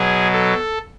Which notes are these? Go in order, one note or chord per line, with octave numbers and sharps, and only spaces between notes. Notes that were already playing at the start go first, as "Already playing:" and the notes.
Already playing: B2 F#3 G#4
A4